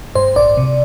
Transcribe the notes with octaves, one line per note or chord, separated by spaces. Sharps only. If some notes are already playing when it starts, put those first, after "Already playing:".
G2 C5
A1 D5
C3